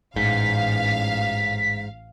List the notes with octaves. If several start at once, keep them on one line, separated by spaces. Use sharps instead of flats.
A1 G#2 F5 B6